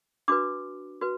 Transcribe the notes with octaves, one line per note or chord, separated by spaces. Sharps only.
D4 F#4 B4 D6
F#4 B4